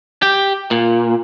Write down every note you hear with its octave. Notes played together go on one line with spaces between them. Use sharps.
G4
A#2